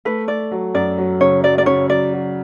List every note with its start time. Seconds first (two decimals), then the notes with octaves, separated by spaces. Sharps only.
0.05 A3 B4
0.28 A3 D5
0.51 F#3
0.74 F#2 D5
0.98 F#3
1.21 C#3 C#5
1.43 F#3 D5
1.58 D5
1.66 C#3 C#5
1.90 F#3 D5
2.13 F#3